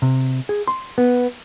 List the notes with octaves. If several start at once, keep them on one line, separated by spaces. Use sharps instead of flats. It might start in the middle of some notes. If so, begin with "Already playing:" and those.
C3
G#4
C6
B3